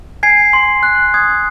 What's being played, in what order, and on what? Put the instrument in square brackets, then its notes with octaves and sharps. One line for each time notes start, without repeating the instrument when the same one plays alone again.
[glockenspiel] G#5 G#6 C7
C6
F#6
D#6 G#6